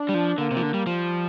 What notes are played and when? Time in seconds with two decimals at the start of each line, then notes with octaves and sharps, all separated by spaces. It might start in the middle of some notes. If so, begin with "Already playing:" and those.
Already playing: D4
0.09 G3
0.14 F3
0.38 D3 A#3
0.51 C3
0.57 F3
0.62 D3
0.74 G3
0.86 F3 G3